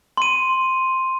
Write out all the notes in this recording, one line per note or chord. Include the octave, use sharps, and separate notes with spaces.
C6 D#7